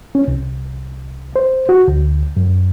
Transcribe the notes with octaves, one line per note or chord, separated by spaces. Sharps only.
C#4
C2
C5
F#4
D2
F#2